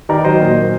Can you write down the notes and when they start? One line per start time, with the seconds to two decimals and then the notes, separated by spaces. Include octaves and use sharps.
0.09 D#3 A#4 D5
0.24 F#3 C5 D#5
0.40 A#2